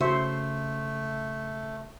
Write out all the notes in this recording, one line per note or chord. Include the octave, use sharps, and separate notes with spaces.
C#3 A3 F#4 C5 E5 C#6